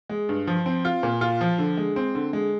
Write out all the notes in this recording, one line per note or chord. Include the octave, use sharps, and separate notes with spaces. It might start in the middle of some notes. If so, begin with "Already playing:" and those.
G#3
G2
F3
C4
F4
A#2
F4
F3
D3
G#3
C4
D3
G#3